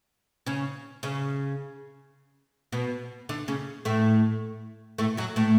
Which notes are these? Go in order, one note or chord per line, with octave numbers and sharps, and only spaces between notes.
C#3 C#4
C#3 C#4
B2 B3
D3 D4
C#3 C#4
A2 A3
A2 A3
F#2 F#3
A2 A3